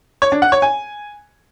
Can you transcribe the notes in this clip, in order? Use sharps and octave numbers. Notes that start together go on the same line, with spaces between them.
C#5
D4
F#5
C#5
G#5